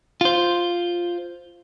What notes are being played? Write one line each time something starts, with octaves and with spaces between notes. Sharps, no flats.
F4 C5